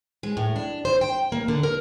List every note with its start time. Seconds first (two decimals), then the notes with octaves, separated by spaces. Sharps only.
0.23 G#3
0.37 A2
0.56 D4
0.85 C5
1.01 G5
1.32 A#3
1.48 D3
1.63 A#4